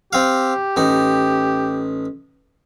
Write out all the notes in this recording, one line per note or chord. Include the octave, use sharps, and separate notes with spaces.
C4 G4 F5
A1 D#4